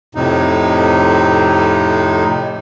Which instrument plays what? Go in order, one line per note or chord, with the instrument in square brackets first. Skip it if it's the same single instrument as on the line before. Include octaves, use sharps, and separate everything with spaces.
[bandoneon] F2 A2 C3 D#4